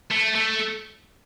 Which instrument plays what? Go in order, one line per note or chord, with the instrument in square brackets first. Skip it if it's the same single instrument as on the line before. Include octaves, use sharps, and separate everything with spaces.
[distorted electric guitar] A3
A3